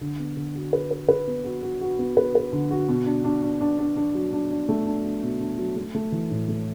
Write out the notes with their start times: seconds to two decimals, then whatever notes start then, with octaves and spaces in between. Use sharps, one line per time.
0.01 D3
0.19 B3
0.37 D3
0.55 F#4
0.73 B4
0.91 B4
1.09 B4
1.27 B3
1.44 F#4
1.63 F#4
1.81 F#4
1.99 B3
2.17 B4
2.35 B4
2.52 D3
2.71 F#4
2.89 B2
3.06 D4
3.24 D4
3.43 D4
3.61 D4
3.79 D4
3.96 D4
4.15 F#3
4.33 D4
4.50 D4
4.69 A3
4.86 D4
5.05 D4
5.23 B2
5.41 D4
5.58 F#3
5.76 A3
5.95 A3
6.12 E3
6.31 A2
6.48 A3